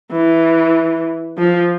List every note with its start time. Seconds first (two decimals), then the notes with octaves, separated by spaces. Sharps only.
0.12 E3
1.38 F3